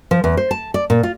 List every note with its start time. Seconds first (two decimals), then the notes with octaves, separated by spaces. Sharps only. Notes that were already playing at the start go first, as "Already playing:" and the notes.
0.11 F3
0.24 E2
0.37 C5
0.51 A5
0.74 D5
0.90 A#2
1.03 F4